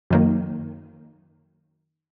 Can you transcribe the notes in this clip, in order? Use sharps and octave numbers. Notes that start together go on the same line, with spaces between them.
F#2 D#3 A#3